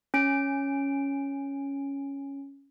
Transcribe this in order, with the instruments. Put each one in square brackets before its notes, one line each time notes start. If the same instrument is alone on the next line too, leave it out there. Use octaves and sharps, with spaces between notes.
[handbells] C#4 D7